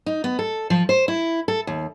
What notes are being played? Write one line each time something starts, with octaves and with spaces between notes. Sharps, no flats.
D#4
B3
A4
F3
C5
E4
A4
D#2